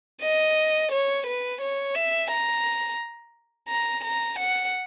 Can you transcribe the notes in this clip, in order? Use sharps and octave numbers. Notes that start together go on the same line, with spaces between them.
D#5
C#5
B4
C#5
E5
A#5
A#5
A#5
F#5